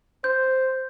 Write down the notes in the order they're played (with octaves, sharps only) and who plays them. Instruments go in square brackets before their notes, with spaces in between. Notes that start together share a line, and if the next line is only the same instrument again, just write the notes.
[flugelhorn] C5 [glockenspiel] G6